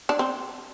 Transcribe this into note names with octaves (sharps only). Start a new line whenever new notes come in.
D4
C4